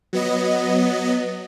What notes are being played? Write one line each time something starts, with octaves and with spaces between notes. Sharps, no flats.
F#3 B3 D#5